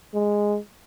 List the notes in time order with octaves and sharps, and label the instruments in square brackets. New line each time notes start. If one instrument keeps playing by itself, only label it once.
[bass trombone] G#3